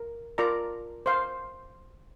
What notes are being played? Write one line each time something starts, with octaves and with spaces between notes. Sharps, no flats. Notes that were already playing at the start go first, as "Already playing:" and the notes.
Already playing: A#4
F4 A#4 D5 A#5
C5 F5 C6